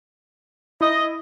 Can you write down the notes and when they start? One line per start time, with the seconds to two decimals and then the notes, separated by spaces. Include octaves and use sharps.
0.81 E4 D#5